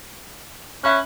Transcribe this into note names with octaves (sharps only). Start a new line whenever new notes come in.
C#4 E5 B5 F#6